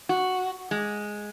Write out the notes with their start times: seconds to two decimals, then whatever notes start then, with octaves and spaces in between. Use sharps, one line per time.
0.09 F#4
0.71 G#3